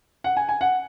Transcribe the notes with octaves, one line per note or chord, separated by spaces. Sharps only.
F#5
G#5
G#5
F#5